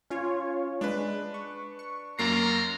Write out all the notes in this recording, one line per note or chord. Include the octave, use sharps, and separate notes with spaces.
C#4 F4 C#5
G#3 D4 B4
C#6
C#6
F#2 A#3 F4 A#5 C7